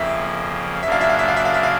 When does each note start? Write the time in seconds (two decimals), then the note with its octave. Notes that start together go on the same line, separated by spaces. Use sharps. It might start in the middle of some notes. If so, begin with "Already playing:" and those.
Already playing: F2 C#3 F3 A#3 E5
0.83 F#2 C#3 F#3 A#3 D4 E5
0.92 F5
1.01 E5
1.09 F5
1.19 E5
1.28 F5
1.36 E5
1.45 F5
1.54 E5
1.63 F5